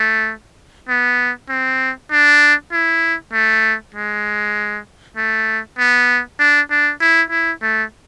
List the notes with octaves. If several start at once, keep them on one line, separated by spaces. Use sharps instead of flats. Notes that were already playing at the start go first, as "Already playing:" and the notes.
Already playing: A3
B3
C4
D4
E4
A3
G#3
A3
B3
D4
D4
E4
E4
A3